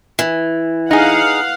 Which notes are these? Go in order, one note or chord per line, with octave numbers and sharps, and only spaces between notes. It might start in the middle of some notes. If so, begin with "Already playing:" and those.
E3
D#4 G#4 F5 F#5